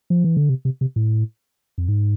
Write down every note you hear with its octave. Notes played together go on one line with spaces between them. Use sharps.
F3
E3
D3
C3
C3
C3
A2
F2
G#2